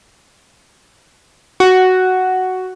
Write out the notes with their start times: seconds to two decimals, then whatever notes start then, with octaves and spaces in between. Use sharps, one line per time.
1.60 F#4